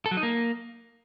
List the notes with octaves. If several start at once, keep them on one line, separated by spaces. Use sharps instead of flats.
A4
F#3
D#4
A#3